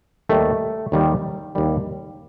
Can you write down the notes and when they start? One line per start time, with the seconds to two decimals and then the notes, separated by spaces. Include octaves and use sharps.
0.29 D#2 D#3 G3 A3
0.92 D#2 D#3 G3
1.55 D#2 D#3 G3